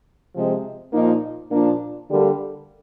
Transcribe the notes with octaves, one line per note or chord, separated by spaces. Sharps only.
C3 F3 G#3 C4
A#2 F3 A#3 D#4
A#2 F3 A#3 D4
D3 G3 A#3